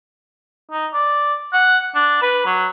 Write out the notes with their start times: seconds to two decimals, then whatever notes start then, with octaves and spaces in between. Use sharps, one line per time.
0.71 D#4
0.94 D5
1.53 F#5
1.95 D4
2.23 B4
2.46 F#3